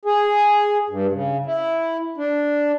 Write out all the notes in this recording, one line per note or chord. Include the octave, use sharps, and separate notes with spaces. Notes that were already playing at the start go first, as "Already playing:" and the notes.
G#4
G2
C#3
E4
D4